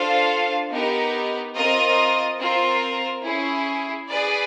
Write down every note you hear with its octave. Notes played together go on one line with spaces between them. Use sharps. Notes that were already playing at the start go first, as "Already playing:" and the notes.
Already playing: D4 F4 A4 C5 F5
B3 D#4 G4 A#4
C4 F4 A#4 D#5
C4 F4 A#4
C#4 E4 G#4
G#4 B4 D5